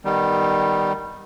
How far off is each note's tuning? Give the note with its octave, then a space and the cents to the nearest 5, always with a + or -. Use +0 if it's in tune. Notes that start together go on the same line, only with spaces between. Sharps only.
D#3 -10 G3 +0 B3 +0